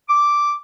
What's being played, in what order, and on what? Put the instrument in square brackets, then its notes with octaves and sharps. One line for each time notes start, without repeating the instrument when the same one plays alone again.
[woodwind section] D6